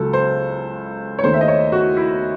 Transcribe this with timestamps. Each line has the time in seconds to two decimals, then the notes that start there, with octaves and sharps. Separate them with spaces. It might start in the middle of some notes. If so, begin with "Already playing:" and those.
Already playing: C#2 C#3 F#3 A4
0.13 C5
1.19 C#5
1.24 D#2 D#3 A3 C5
1.34 E5
1.41 D#5
1.48 C#5
1.72 F#4
1.97 E4